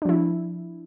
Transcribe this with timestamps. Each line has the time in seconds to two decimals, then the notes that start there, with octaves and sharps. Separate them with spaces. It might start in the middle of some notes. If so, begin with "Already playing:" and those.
0.02 D4
0.05 F3
0.09 E4